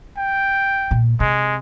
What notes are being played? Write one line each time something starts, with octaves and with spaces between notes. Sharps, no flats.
G5
A#2
C3 G#3